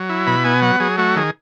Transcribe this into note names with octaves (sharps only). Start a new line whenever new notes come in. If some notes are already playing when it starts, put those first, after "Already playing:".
Already playing: F#3
E4
B2 B5
B3 G#5
F#3 F#5
F#3 G#4
A3 F#4
D#3 G#4